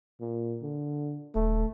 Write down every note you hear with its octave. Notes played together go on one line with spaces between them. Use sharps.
A#2
D3
D#1 A3